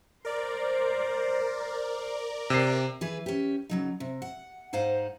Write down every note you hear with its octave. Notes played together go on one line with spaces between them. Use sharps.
A#4 C5 D5
C3 C7
E3 G#4 B4
C#4 G4
C#3 F#3 D#4
C3
F#5
G#2 D#4 C5 F5 F#5